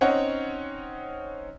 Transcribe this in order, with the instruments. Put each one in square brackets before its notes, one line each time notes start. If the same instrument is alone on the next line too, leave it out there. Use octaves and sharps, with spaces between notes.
[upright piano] C4 C#4 D#4 C#5 F#5